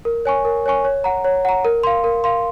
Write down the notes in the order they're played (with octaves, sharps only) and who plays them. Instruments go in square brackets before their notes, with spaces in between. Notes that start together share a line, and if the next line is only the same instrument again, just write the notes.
[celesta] A#4
C#5 G#5 C#6
A#4
C#5 G#5 C#6
C#5
F#5 A#5
C#5
F#5 A#5
A#4
F5 C6
A#4
F5 C6